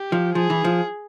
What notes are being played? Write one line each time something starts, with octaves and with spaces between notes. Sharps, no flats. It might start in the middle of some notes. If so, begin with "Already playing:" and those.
Already playing: G4
F3
F3 G#4
E3
F3